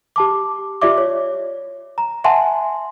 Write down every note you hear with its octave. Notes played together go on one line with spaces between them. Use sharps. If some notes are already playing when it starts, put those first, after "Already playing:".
G4 A5 D6
F4 G4 D5 E5 D6
C#5
A#5
E5 F#5 G#5 A5 C6